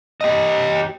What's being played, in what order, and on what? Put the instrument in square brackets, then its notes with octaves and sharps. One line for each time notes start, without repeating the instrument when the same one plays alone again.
[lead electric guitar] G4 D#5